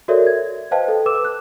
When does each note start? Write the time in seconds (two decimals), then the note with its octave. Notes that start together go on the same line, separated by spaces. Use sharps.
0.08 F#4 A4 A#4 C#5 D5 E5
0.27 G#6
0.71 B4 C5 D#5 F5 G5 A5
0.88 A4
1.06 B4 D6 E6 E7
1.25 F#6